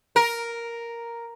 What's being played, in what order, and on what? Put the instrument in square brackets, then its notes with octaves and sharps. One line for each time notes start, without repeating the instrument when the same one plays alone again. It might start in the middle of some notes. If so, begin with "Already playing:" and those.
[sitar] A#4